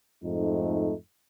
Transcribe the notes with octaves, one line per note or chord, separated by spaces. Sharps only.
F2 G#2 A3 D#4